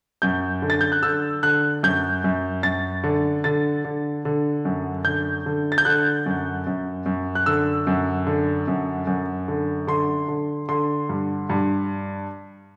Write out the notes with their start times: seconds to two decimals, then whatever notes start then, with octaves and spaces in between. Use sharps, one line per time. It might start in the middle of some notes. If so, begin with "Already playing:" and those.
0.22 F#2 G6
0.62 D3
0.70 A6
0.81 G6
0.92 F#6
1.03 D3 E6
1.43 D3 F#6
1.83 F#2 G6
2.24 F#2
2.63 F#2 A6
3.04 D3
3.44 D3 A6
3.85 D3
4.25 D3
4.65 F#2
5.05 D3 G6
5.46 D3
5.72 A6
5.78 G6
5.85 D3 F#6
6.26 F#2
6.67 F#2
7.06 F#2
7.35 F#6
7.46 D3 E6
7.87 F#2
8.27 D3
8.68 F#2
9.07 F#2
9.48 D3
9.87 D3 C6
10.28 D3
10.69 D3 C6
11.09 G2
11.50 G2